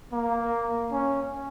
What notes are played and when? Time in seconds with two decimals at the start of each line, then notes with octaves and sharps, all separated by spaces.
0.12 A#3
0.92 C#4